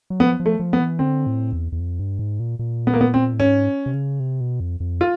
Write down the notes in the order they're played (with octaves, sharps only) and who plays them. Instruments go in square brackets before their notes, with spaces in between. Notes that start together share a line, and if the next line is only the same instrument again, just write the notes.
[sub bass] F#3
[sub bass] F3 [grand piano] B3
[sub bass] F3
[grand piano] A3
[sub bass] F3
[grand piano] B3
[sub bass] E3
[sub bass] D3 [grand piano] C4
[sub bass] A2
E2
E2
F2
G2
G#2
A#2
A#2
[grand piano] B3
A#3
B3
C4
[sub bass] A2
[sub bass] G#2 [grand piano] C#4
[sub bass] C3
C#3
C3
B2
F2
F2
[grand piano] F4